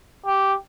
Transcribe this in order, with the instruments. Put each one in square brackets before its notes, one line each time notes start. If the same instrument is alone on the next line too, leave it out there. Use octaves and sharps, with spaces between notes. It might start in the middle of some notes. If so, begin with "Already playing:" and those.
[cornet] G4